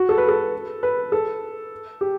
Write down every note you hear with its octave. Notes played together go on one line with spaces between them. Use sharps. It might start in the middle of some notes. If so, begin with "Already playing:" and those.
Already playing: F#4
A4
B4
A4
B4
A4
G4